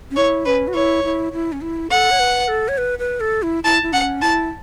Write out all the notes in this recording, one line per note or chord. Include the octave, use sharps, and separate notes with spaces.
C#4
E4 C#5
C#4 B4
F#4
E4 C#5
E4
E4
C#4
E4
A4 F#5
C#5
B4
A4
C#5
B4
B4
A4
E4
E4 A5
E4
C#4 F#5
E4 A5